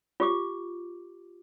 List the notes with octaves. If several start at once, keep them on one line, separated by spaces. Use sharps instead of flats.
F4 G4 D6